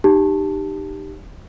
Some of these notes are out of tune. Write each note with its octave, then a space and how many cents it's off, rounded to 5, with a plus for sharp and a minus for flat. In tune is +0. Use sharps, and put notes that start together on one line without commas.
D#4 -30 G4 +0 A5 +0